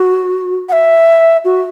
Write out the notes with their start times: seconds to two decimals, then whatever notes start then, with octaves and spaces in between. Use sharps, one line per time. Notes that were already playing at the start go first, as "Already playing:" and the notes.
Already playing: F#4
0.69 F#5
0.72 E5
1.45 F#4